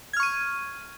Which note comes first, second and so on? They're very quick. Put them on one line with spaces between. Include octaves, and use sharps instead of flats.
G#6 F6 C#6 D#7